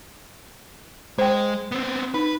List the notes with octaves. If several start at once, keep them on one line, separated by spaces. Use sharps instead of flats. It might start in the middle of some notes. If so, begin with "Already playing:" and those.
G#3 C5 G5
B3 C4
D#4 B4